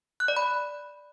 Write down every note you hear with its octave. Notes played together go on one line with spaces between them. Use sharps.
F#6
D5
B5